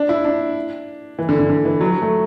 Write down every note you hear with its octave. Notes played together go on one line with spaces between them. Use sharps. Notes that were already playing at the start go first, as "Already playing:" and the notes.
Already playing: D4
E4
D4
E3
D3
D3
D3
E3
F#3
F#3
A3